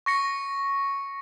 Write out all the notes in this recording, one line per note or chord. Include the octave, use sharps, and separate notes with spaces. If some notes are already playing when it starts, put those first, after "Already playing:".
C#6 A#6 C#7